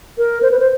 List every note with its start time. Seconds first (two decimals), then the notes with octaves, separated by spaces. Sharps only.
0.18 A#4
0.42 C5
0.51 B4
0.59 C5